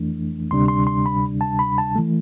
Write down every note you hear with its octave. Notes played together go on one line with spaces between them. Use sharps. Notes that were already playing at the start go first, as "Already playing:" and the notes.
Already playing: F2 E3 A3 D4
D2 C3 G3 D4 C6
C6
C6
B5
A5
B5
A5
E3 A3